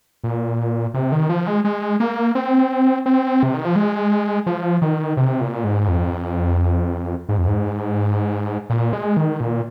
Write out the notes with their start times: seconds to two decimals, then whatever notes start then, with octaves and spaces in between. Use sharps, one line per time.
0.24 A#2
0.94 C3
1.12 D#3
1.29 F3
1.47 G#3
1.65 G#3
2.00 A#3
2.35 C4
3.06 C4
3.43 C3
3.54 D#3
3.65 F3
3.76 G#3
4.46 F3
4.82 D#3
5.17 C3
5.41 A#2
5.64 G#2
5.88 F2
7.29 G#2
7.38 F2
7.48 G#2
8.70 A#2
8.93 G#3
9.17 D#3
9.40 A#2